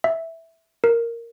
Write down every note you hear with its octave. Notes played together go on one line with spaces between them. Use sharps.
E5
A#4